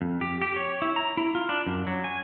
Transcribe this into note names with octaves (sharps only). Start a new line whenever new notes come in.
F2
G4
G4
C#5
E4
A#5
E4
F4
D4
F#2
F#3
G#5